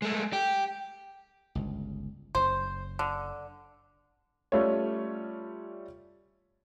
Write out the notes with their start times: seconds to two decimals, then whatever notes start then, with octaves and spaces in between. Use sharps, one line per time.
0.02 G#3 A3
0.33 G4
1.55 G1 C#2
2.35 F#1 C5
2.99 D3
4.52 G3 A3 C#4 F4 C#5